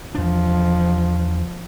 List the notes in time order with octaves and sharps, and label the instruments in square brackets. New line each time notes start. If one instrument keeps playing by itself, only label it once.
[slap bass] E2 D4 [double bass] F3